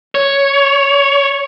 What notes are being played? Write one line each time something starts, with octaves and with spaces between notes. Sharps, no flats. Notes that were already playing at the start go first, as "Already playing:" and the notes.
C#5